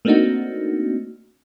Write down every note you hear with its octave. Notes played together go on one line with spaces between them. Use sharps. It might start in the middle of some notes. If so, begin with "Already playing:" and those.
A3 A#3 C4 D4 D#4 F#4